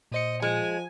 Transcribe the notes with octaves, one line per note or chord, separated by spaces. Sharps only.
A#2 C5 D#5 C#7
F3 G#3 G#5